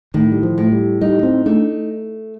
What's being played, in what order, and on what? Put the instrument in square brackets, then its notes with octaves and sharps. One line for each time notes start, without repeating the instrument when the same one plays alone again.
[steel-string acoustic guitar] A2 [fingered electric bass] D#3
[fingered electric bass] G3
F3
[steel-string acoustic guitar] A2
[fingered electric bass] G3
[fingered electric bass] G3 [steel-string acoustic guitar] D#4
[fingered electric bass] C4
[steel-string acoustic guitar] A3 [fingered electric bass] D4